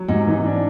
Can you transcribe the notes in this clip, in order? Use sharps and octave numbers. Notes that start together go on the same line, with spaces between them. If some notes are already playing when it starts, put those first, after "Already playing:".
Already playing: F#3
G#2 C3
E3
D4